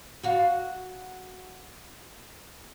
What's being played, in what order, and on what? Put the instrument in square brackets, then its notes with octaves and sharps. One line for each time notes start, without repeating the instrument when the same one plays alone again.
[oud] F#4 F5